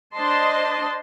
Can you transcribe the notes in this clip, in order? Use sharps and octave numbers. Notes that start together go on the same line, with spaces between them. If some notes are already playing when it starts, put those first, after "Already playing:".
D4 C5 D#5 A5 C6